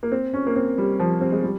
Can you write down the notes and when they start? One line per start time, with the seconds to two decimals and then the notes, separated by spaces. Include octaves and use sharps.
0.03 A#3
0.12 C4
0.33 C#4
0.47 A#3
0.56 C4
0.78 G3
0.99 F3
1.21 C4
1.32 G#3
1.43 G3